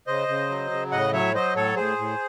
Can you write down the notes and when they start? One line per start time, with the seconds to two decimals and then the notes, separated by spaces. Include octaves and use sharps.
0.07 C#3 C5 D#5
0.28 C#3
0.49 F#3
0.71 C#3
0.91 A2 D#5 F#5
1.13 F#3 C#5 E5
1.35 F#3 C5 D#5
1.55 A2 A4 C#5
1.76 A2 G#4 C5
1.98 A2